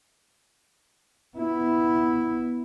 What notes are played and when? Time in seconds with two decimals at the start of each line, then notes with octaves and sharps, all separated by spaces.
1.38 B3 E4